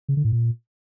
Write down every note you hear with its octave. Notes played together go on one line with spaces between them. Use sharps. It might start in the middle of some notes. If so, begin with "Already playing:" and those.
C#3
D3
A2
A#2